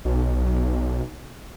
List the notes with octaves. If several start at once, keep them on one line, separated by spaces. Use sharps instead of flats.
B1